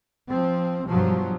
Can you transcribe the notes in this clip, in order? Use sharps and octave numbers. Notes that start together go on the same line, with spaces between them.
F3 C4
G2 B2 F3 F#3